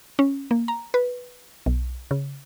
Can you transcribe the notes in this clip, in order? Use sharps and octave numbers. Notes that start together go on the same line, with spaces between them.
C#4
A#3
A#5
B4
B1
C#3